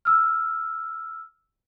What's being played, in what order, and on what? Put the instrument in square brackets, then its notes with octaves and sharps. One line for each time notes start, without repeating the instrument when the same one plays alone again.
[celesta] E6 F6